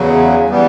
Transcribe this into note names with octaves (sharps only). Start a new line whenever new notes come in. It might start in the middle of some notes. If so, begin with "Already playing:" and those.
Already playing: E2 C#3 F#3
E3 G3 B3